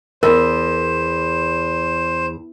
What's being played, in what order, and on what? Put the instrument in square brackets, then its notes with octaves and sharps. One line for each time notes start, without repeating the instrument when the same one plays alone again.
[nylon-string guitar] E2 [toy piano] A#4 [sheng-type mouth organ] C5